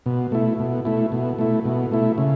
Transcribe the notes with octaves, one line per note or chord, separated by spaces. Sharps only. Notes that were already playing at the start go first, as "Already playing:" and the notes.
B2
A3 E4
B2
A3 E4
B2
A3 E4
B2
A3 E4
C#3